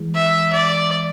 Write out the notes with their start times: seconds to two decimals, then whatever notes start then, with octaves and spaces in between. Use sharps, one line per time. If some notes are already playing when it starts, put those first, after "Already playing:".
Already playing: E3 G#3
0.14 E5
0.52 D5